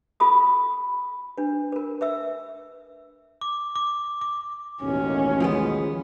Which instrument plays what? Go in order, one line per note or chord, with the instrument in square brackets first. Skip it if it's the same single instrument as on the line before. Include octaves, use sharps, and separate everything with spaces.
[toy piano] F4 A4 B5 D#6
D4 B4
A#4 B4
B4 E5 E6
[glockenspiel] D6
D6
D6
[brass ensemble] A1 D#2 B2 [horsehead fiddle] C#4
[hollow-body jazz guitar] F3 G#3 B3